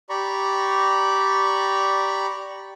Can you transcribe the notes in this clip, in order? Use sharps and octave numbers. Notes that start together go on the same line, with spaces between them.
G4 D5 A#5 B5 C#6